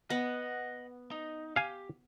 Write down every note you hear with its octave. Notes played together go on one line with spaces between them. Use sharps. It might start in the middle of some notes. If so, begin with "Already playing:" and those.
B3 D#5 F#5
D#4
G4 F5 G#5